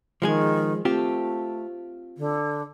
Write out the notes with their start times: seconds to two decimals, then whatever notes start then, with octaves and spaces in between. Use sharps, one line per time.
0.22 D#3 F3 G#3 G#4
0.85 A3 C4 F4 G4
2.17 D3